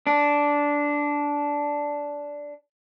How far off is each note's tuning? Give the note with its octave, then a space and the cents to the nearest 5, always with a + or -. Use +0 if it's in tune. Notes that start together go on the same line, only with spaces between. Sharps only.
D4 -10